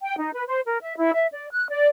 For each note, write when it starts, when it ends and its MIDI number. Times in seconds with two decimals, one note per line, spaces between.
0.01 0.15 79
0.18 0.30 63
0.34 0.43 71
0.47 0.61 72
0.66 0.78 70
0.80 0.96 76
0.97 1.11 64
1.14 1.27 76
1.32 1.47 74
1.52 1.66 90
1.69 1.88 74